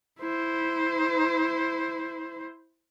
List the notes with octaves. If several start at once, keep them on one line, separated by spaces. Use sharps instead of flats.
E4 C5